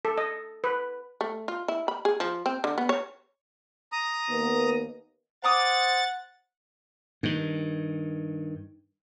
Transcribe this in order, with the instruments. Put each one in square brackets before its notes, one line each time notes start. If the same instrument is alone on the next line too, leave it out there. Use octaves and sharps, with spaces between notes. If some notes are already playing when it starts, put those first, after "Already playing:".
[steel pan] A4
D#5
B4
[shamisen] A3
F4
E4
B5
G#4
F3
C4
D3
B3
C#5
[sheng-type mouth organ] A#5 D#6
[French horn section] D#2 A#3 B3
[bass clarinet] C5 [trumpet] F#5 [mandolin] A#5 D6 D#6 [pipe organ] A6
[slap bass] G2 D#3